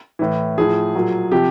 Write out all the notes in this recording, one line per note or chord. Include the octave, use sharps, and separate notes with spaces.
A2 E3
A2 F3 G#4
A#2 F#3
C3 F3 G4